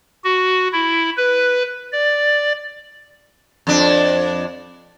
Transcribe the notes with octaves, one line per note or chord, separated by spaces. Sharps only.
F#4
E4
B4
D5
F2 D4